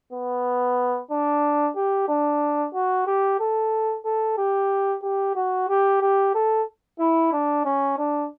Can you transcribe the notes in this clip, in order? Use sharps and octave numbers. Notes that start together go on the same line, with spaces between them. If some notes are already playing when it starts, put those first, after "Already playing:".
B3
D4
G4
D4
F#4
G4
A4
A4
G4
G4
F#4
G4
G4
A4
E4
D4
C#4
D4